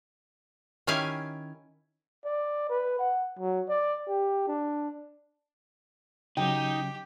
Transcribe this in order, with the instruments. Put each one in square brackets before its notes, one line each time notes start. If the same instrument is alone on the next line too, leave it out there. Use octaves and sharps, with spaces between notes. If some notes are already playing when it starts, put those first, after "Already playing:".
[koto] D#3 C#4 E4 G4 F5 G#5
[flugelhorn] D5
B4
F#5
F#3
D5
G4
D4
[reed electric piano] C#3 F#3 C#4 [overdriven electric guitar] D#4 [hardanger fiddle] G4 [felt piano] G5